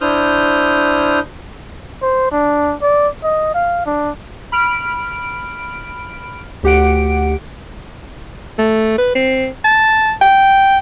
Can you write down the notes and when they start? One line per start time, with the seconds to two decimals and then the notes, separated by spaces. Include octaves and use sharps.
0.01 D4 E4 C5 D#6 F6 G6
2.02 C5
2.31 D4
2.81 D5
3.23 D#5
3.54 F5
3.86 D4
4.52 B5 F6 D7
6.63 D2 G4 F#5 D7
8.58 A3
8.98 B4
9.15 C4
9.65 A5
10.21 G5